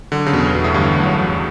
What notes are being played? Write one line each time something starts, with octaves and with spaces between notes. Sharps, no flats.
D3 F#3
C#3
E2 B2
E2 B2
A2
G2 D3
A2
F#3
E2